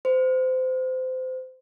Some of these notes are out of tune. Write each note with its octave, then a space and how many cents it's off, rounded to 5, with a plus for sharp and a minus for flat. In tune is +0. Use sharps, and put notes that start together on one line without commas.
C5 -25